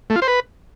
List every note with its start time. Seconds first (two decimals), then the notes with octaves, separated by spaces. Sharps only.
0.10 A3
0.16 F4
0.22 C5
0.28 B4